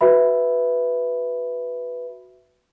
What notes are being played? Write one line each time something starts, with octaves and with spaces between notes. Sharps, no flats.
F#4 B4 E5 B5